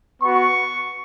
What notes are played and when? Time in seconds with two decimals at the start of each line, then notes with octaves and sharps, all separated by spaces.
0.20 B3 F#4 C#6